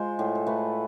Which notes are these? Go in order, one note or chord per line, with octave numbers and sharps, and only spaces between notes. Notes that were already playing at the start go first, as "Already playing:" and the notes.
Already playing: G#3 F4 C5
A2
A4
A3 B4